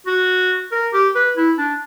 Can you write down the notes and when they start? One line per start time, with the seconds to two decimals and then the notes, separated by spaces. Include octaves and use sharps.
0.07 F#4
0.72 A#4
0.93 G4
1.15 B4
1.37 E4
1.58 D4